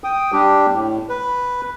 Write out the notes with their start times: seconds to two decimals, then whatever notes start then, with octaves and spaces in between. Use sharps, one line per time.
0.04 G5 D#6
0.32 G3 D4 G4
0.73 A2
1.09 B4